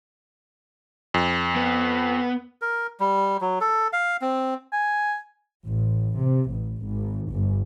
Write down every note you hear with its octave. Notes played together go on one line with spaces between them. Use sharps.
F2
B3
A#4
G3
F#3
A4
F5
C4
G#5
A1
C3
A1
G#1
G1